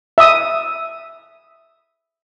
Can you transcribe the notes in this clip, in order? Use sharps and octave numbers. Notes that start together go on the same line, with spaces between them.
E5 D#6